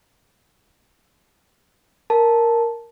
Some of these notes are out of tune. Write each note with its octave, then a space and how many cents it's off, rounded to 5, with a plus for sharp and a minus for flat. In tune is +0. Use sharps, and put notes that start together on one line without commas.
A#4 +0 A5 -5